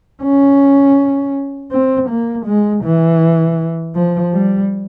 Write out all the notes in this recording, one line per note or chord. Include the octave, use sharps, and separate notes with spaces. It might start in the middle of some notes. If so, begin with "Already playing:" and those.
C#4
C4
A#3
G#3
E3
F3
G3